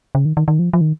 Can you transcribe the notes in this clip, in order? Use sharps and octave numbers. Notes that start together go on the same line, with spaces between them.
C#3
D#3
D#3
D#3
F3
F3
D#3